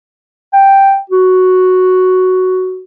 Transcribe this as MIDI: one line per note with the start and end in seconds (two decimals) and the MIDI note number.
0.53 0.98 79
1.10 2.82 66